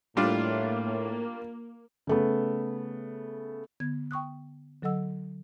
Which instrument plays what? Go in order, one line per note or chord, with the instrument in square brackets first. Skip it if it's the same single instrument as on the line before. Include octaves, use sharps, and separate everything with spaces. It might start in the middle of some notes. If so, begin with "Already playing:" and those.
[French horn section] A2 [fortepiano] G3 D4 F4 [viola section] A#3
[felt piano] C#3 A3 B3
[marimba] D3 B3 G#6
G5 C#6 D#6 F#6
D3 F#3 A4 D#5 F#5 E6